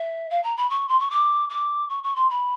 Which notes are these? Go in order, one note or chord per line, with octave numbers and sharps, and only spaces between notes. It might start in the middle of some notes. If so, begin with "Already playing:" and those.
Already playing: E5
F5
A#5
B5
C#6
C6
C#6
D6
D6
C#6
C#6
C6
B5